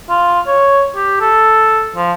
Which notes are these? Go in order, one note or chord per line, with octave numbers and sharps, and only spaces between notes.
F4
C#5
G4
A4
F3